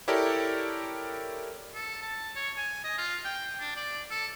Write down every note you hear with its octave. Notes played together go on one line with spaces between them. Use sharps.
E4 G4 A4 A#4 C#5 D5
A4
A5
C#5
G#5
D#5
F4
G5
D4
D5
A4